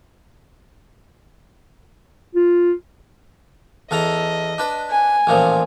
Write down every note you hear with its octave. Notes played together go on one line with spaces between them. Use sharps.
F4
E2 A4 D#5 A#5
D4 B4
G#5
A1 A#2 F3